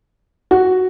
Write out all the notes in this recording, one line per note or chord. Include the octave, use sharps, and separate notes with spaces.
F#4